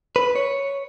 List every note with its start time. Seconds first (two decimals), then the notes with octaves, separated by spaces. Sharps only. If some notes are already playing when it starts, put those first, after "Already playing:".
0.16 B4
0.36 C#5